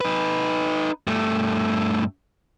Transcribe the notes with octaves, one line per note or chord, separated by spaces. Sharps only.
D#4 B4
G2 A3